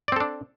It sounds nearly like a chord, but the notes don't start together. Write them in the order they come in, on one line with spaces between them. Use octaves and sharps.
D5 C4 A4 D4